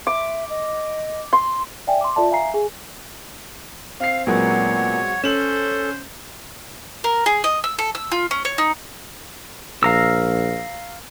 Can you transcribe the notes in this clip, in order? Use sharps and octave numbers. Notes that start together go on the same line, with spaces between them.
E5 D6
D#5
C6
D5 E5 G5 G#5
C6 D6
F4 A4 D5 E5 A5
E5 F5 G#5 A#5 C7
G#4 G#5
C4 F5 C7
A#2 F#3 G#3 B3 C4 A#4 C#5 F#5
C#4 A4 C5 E7 F#7
A#4
G#4
D#5
E6
A4
E6
F4
C#4
C#5
D#4
A#1 F5 A#5 E6